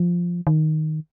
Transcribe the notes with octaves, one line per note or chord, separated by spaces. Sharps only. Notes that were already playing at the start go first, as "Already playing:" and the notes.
Already playing: F3
D#3